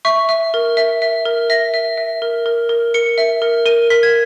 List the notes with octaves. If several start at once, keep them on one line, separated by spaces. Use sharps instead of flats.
E5 C#6
E5
A#4
E5
E5
A#4
E5 A#6
E5
E5
A#4
A#4
A#4
A#4 C#7
E5
A#4
A#4 D#7
A#4 B6
G#6